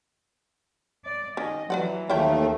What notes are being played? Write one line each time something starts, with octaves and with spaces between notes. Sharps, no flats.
D5
D#3 C#4 D#5
E3 F#3 B4 D5 F#5
D#2 A3 C#4 E4 G5